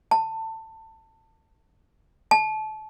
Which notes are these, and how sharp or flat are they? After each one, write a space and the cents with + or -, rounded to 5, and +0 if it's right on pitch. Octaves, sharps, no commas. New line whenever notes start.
A5 +20
A5 -30